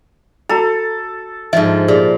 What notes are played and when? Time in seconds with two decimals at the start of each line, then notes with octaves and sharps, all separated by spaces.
0.49 F#4 A4 A#5 B5
1.53 G#2 F3 E5
1.88 A#2 G4 G#4 D5